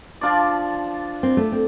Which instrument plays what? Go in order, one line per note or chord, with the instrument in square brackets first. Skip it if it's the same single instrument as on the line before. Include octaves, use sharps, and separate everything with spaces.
[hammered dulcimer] F3 D4 F4 D5
[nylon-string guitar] C4
A3
C4